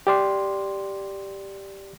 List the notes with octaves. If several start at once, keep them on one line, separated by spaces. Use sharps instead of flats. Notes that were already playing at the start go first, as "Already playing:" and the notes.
G4 D5 C6